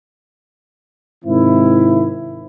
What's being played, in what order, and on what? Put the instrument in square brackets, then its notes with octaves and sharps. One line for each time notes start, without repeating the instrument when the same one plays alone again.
[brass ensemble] G#2 C3 D#3 C4 E4